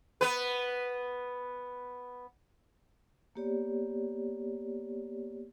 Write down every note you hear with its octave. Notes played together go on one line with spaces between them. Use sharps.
B3 B4
A#3 B3 G4 C#5 D5